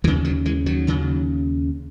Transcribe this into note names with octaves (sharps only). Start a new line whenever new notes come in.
D#2 C#3 E3
D#3 F#3
E3 G#3
D#3 F#3
D#2 C#3